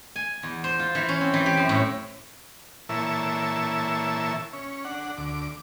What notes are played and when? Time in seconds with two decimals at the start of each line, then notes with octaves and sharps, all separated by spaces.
0.16 G#5
0.43 E2
0.64 C5
0.79 F4
0.95 E3
1.09 C#4
1.21 C4
1.34 E3
1.46 G4
1.57 F#2
1.69 A2
2.89 A#2 E3 E4 C#5 A5 E6
4.53 C#4
4.85 D4 F#5
5.17 D2 D6